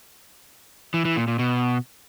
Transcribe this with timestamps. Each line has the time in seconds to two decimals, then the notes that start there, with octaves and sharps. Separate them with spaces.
0.94 E3
1.05 E3
1.16 A#2
1.28 A#2
1.39 B2